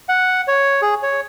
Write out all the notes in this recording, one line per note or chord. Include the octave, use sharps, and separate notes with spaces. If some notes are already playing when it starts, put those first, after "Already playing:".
F#5
C#5
G#4
C#5